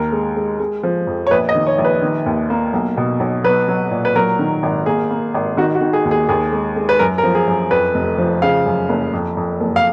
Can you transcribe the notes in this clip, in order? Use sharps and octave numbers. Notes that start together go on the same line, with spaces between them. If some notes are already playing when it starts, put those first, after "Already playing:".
Already playing: D#2 A#4
G#3
G#3
G#3
F3
F2
C#5
A#1 B4
D#5
D#3
C#5
A#1
B4
D#3
D#2
A#3
B1
B2
B1
F#3 B4
F#3
A#2
B4
F#3 A#4
D#3
G#1
A#3 G#4
A#3
G#1
D#3 F#4
F#4
D#3
G#4
D#2
G#4
D#2 G#4
G#3
G#3
B4
F#2 A#4
A#4
F3
G#4
F#2
F2 B4
F1
F3
C#3 F5
F#2
F#1
F2
F2
F#1
F5